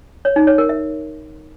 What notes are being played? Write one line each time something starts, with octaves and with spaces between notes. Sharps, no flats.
C#5
D#4
C#5
A#4
E5